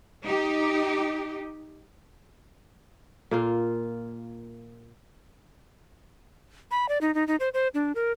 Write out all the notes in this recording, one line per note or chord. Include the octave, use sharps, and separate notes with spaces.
D#4 G4
A#2 A#3 F4
B5
D5
D#4
D#4
D#4
C5
C5
D4
A#4